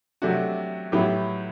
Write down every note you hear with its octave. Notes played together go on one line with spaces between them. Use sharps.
C3 F#3 A3 D4 F#4
A2 F#3 B3 E4 G4